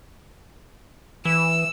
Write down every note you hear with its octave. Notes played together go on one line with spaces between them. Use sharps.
E3 E6